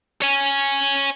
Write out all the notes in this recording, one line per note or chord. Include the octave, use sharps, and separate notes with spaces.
C#5 G#5